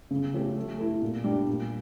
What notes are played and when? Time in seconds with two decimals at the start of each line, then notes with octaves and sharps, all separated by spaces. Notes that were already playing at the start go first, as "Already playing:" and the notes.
0.11 C#3
0.34 F3 A3 C#4 G4
0.57 A3
0.78 E4 A4
1.02 A#2
1.24 G3 D4 G4
1.47 A#2